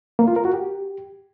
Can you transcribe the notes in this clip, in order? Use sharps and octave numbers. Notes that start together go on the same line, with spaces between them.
A#3
F4
A#4
F#4
G4